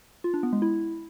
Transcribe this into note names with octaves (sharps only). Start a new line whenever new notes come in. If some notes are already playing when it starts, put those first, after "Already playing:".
F4
D4
B3
G#3
E4